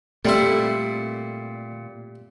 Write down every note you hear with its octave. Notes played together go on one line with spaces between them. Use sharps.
A#2 G3 A3 C4 E4 A4